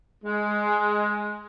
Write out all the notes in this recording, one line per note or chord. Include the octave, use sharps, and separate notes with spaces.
G#3